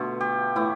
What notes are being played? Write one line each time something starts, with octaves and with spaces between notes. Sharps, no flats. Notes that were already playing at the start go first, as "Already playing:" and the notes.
Already playing: B2 D3 A3 F4
G4
A2 E3 A3 E4